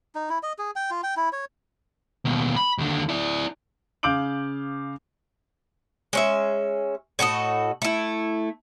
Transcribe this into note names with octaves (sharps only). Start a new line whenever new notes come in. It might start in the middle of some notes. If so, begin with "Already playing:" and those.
D#4
E4
D#5
G#4
G5
F4
G5
E4
C#5
D#2 B2
B5
D#2 D3
E4 D5
C#3 F5 D6 G6 D7 F#7
G#3 C#4 E5
A2 F#4 A4 D#5
A3 E4